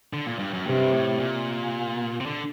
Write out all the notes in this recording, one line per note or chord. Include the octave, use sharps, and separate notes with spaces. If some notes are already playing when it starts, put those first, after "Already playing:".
D3
A#2
G2
F#2
G2 C3
A2
A#2
C3
D3